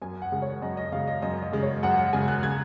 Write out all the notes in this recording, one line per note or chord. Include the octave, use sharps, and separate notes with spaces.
F#2 G#5
F#5
C#3 G#3
C#5
F#2 D#5
D#5
C#3 G#3 F5
D#5
F#2 D#5
D#5
C#3 G#3
C#5
F#2 F#5
F#5
C#3 G#3 G#5
F#6
C#3 G#6